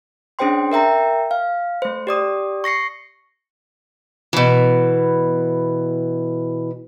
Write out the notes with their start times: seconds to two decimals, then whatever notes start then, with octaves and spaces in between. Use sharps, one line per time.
0.39 C#4 D4 G#4 C5 G5 C6
0.72 A#4 E5 G5 A#5
1.31 F5
1.82 A3 C5
2.07 G4 D5 D#6
2.64 C#6 A#6 C7 C#7
4.33 B2 E3